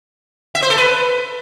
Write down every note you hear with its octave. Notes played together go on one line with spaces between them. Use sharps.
E5
C5
A4
B4